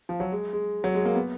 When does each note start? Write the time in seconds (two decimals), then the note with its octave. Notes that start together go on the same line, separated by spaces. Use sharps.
0.09 F3
0.20 F#3
0.32 G#3
0.53 G#3
0.84 F#3
0.95 G#3
1.05 A#3
1.15 B3